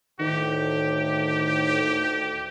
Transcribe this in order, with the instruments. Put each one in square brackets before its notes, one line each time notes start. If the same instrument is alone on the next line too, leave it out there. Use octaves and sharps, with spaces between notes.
[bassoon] D2 [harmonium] A2 [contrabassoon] D#3 [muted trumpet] G4